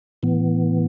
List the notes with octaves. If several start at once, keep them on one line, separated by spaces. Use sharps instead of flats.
A2 E3 B3